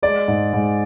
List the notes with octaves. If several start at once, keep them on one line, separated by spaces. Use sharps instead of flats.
G#3 D5
G#2
G#2